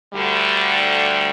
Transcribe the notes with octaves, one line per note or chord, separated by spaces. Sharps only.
D2 D3 G3